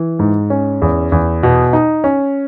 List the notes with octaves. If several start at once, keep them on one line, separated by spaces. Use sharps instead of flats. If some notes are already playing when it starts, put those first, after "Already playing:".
Already playing: E3
G#2
C#4
E2
E2
B2
D#4
C#4